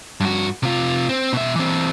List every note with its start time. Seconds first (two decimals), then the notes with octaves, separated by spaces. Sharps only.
0.20 G2 F#4
0.63 C3 F4
1.09 C4
1.33 B2 E5
1.56 E3 C4